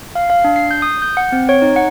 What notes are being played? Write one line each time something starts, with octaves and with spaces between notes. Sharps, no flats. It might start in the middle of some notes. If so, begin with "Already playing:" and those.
F5
F5
D4
C7
G6
D#6
G6
F#5
C4
C#5
D#4
F#5